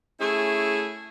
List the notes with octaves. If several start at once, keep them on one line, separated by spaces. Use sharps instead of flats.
A3 C#4 E4 G#4